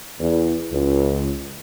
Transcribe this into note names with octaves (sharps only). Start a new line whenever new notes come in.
E2
C#2